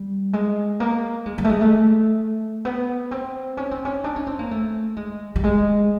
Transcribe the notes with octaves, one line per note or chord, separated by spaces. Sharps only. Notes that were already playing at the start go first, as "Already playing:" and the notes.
Already playing: G3
G#3
A#3
G#3
G3
A3
G#3
A3
B3
C4
C#4
C4
C#4
D4
C#4
C4
A#3
A3
G#3
G3
G#3